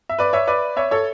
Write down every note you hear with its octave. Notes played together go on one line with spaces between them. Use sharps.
E5
B4 D5
C#5 E5
B4 D5
C#5 E5
A4 C#5